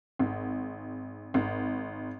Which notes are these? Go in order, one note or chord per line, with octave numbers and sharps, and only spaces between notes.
G#1
G#1